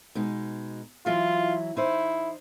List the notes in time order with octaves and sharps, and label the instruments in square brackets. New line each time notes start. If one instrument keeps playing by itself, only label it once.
[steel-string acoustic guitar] B2 G#3 D#4
[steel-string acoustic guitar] E3 F#3 E4 [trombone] F4
[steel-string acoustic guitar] D#4 C5 [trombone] E4